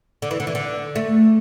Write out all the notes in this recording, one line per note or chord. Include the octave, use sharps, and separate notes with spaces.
D3
E3
D3
E3
D3
A3